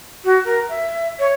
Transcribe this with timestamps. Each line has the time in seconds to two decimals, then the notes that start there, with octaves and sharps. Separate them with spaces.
0.25 F#4
0.45 A#4
0.69 E5
1.19 C#5